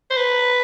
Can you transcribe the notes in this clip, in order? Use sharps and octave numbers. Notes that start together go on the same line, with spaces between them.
C5
B4